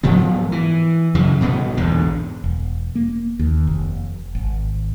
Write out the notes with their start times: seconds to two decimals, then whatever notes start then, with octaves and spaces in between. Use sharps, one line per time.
0.03 G#2 F3 F#3 B3
0.52 E3
1.15 F#2 C#3 E3
1.41 C2 B2 B3
1.77 A#1 E2 G#2 D3
2.44 E1
2.95 A#3
3.39 D#2
3.67 F1
4.35 G#1